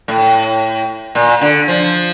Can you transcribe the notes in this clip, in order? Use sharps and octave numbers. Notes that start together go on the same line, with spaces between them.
A2
A#2
D3
F3